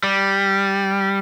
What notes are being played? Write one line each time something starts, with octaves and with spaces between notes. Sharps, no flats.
G3